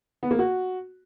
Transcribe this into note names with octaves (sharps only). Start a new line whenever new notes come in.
B3
A#3
F#4